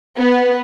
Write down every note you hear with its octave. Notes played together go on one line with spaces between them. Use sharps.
B3